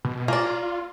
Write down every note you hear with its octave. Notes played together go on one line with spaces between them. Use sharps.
B2
A#3 F4 D5